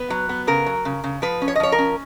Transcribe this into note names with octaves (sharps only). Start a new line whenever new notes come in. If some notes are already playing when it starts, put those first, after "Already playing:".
Already playing: B3 B4
F#3
B3
C#3 A#4
F#3
C#3
C#3
F3 B4
C#4
C#5
D#5
F3 C#5
A#4
C#4